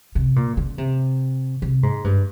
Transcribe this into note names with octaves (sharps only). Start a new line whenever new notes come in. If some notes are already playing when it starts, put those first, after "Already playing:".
C3
A#2
C#3
C3
C3
G#2
G2